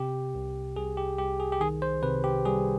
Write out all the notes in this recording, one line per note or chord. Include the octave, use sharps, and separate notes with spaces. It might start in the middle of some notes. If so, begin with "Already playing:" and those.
Already playing: C3 G4
C2
C2 G#4
G4
C2 G4
G#4
G4
D#3 G#4
C5
C3 B4
G4
G3 G#4